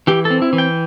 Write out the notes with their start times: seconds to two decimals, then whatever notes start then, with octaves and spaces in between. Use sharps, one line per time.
0.07 E3 G4
0.25 A4
0.30 C4
0.42 E4
0.53 E3
0.58 G5